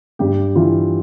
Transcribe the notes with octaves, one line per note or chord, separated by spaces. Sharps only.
G2 G4
E3 F4